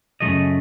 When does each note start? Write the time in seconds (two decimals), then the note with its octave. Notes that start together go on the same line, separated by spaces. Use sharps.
0.20 F#2 C#3 F3 A3 D#5